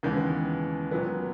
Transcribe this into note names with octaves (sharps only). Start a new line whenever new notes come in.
D#2 C#3 E3 G#3 B3 G6
A#2 F#3 B3